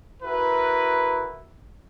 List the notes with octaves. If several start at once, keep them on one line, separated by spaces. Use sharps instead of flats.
E4 F#4 A#4 B4